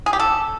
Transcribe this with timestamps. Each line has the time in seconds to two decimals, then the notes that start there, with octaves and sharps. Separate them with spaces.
0.06 G#4
0.13 G4
0.20 A4